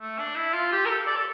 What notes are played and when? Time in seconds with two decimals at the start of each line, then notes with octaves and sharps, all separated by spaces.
0.01 A3
0.19 D4
0.36 E4
0.53 F4
0.72 G4
0.86 A#4
0.89 A4
1.07 D5
1.16 A4